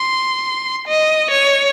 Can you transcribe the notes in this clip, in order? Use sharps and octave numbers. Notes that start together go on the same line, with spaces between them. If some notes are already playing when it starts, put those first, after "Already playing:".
Already playing: C6
D#5
C#5